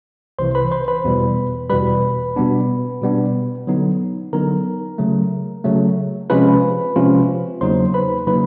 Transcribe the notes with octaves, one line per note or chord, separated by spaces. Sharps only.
C2 C3 E3 C5 C6
B4 B5
C5 C6
B4 B5
E2 B2 G3
E2 B2 G3 B4 B5
B2 G3 B3 D4
B2 G3 B3 D4
D3 F#3 B3 D#4
D3 F#3 B3 D#4 A#4 A#5
C#3 F#3 A3
C#3 F#3 A3
C3 F3 G#3 C#4 F4 B4 B5
C3 F3 G#3 C#4 F4
E2 C#3 F#3 A#3 D#4 C5 C6
B4 B5
C#3 F#3 A#3 D#4 B4 B5